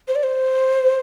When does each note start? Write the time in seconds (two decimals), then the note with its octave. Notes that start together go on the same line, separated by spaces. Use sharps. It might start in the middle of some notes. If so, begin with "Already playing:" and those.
0.08 C5
0.15 D5
0.23 C5